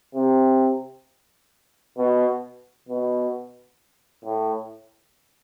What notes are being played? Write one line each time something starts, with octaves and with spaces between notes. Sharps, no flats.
C3
B2
B2
A2